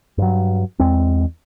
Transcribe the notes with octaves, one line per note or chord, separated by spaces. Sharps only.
G2 F#3
E2 G#3 C4